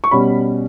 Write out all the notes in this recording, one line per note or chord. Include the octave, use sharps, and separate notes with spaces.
C#6
B2 G3 C#4 B5